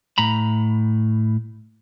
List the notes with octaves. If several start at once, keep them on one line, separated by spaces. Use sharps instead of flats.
A2 A#5 B5